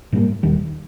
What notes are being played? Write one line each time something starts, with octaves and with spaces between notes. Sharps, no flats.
G#2 G3 A#3
E1 D#2 D#3 G3